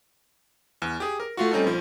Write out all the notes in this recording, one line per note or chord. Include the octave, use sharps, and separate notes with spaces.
E2
G4 G#4
A#4
A3 F4 F#4
G3 C4 C#4 D#4 F4 A4
A#1 F3